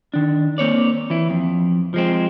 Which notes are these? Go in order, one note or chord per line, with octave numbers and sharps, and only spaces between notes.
D#3 D4
A#3 C4 C#5 D5
E3 E4
F2
F3 G#3 C4